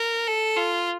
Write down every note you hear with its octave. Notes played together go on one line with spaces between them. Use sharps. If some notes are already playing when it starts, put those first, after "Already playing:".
Already playing: A#4
A4
F4